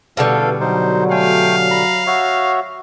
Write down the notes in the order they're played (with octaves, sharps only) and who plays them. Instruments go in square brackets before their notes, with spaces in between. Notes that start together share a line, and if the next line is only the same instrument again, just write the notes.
[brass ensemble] A1 E2 B3 [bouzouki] B2 D3 G3 [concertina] A4 F5
[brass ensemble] F#3 [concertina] D#4 C5
[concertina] A3 G5 G#5 [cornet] F5
[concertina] A#5 B5
F#4 C#5 E5